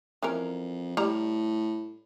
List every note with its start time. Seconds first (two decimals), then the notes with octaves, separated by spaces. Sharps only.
0.23 F2 E3 C#4 A#4
0.97 A2 G3 A#5